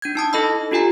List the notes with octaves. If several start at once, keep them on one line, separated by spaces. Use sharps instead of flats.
D4 G6 G#6
D#4 A5 D#6
E4 A4 D#5 B5 E6
D4 F4 G4 G#5 A#5